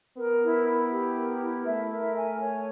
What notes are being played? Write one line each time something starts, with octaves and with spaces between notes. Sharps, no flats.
B3 A#4
E4
E4
G4
A#4
E4
A3 E5
A#4
G#5
C#5